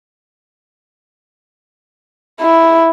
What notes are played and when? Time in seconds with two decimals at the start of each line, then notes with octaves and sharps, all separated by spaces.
2.41 E4